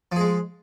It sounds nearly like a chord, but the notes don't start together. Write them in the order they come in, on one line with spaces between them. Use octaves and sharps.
F3 G#4 G#3